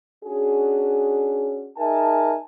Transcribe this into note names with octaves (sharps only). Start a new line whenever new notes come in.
C#4 D4 F#4 G#4
D#4 G#4 A#4 E5 G#5 A5